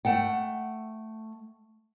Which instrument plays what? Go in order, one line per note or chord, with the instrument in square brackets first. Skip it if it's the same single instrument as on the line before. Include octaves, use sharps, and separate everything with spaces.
[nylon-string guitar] A3 F#5 G5